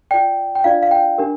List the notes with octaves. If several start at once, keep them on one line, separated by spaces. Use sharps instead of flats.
F4 D5 G5
G5
D4 F4 D5 F5
F5
G5
D4 G4 A#4